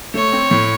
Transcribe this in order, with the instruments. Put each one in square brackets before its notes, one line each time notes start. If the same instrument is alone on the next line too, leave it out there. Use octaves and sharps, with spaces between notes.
[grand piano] A3 [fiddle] C#5
[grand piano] C4
A2